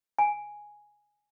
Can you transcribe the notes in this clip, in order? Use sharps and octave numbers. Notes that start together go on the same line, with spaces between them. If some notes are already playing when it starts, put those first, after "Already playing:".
G#5